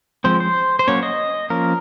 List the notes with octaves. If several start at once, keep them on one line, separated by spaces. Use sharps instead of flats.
F3 G#3 C4 C5
C5
C5
F#3 A#3 C#4 C#5
D#5
F3 A#3 C#4 A#4